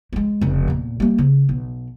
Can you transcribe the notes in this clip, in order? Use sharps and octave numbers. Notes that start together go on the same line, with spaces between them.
G#3 A#3
F1 C#3
E2 A#2
G3 A#3
C#3
B1